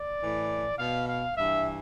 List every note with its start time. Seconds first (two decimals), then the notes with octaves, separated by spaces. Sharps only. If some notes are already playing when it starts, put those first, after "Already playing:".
Already playing: D5
0.21 A2 E3
0.78 B2 F5
1.08 F5
1.36 G2 E3 E5